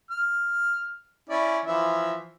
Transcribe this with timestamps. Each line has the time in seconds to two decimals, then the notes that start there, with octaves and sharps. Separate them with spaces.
0.11 F6
1.29 C#4 E4 D5
1.65 E3 F3 E5